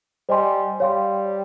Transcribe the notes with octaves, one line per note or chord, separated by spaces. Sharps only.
G3 C5 D#5 G#5 C6
G3 C#5 F5 C6